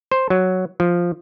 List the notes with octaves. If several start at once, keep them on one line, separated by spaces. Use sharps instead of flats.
C5
F#3
F3